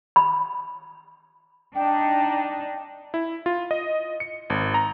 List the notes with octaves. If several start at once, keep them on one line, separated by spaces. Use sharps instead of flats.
B5
D4 D#4 G5
E4
F4
D#5
C#7
G#1
A#5